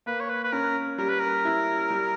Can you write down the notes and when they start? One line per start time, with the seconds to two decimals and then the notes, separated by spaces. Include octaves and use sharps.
0.06 A#3 B4
0.20 C#5
0.29 B4
0.44 B4
0.52 C#4 A#4
0.98 G3 A#4
1.09 B4
1.20 A#4
1.45 E4
1.90 G3